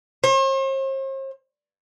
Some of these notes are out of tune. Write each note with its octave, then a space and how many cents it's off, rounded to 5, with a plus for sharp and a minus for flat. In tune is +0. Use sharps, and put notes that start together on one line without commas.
C5 +45